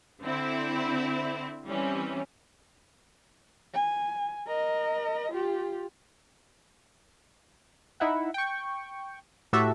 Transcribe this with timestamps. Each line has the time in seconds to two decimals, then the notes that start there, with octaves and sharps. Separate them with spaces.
0.22 D3 C4 E4
1.66 E3 G3 C4 C#4
3.74 G#5
4.47 A#4 D#5
5.32 F4 G4
8.00 D#4 E4 E5 F#5
8.34 G5 C#6
9.53 A2 A3 F#4 G4 A4 E5